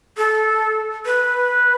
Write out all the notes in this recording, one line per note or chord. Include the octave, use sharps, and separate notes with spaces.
A4
B4